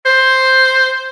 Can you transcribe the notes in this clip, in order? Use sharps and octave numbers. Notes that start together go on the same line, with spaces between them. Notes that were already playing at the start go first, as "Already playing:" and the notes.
C5